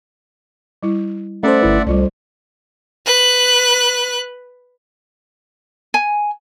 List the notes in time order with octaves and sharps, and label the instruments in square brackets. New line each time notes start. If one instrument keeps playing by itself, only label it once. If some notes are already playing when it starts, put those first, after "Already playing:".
[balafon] G3 E4
[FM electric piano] A3 A4 C5 [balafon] C#4 [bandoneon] D5 E5 F#5
[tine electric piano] G1 E4 B4
[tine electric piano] C2 [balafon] G3 F4 D5
[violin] B4 F#6
[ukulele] G#5